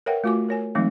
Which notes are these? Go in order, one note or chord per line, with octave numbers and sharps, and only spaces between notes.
A#4 B4 C#5 E5 F#5 G5
A3 F4 F#4 G#5 D6
A#4 C#5 G#5
E3 F#3 G#3 A3 C4 D#4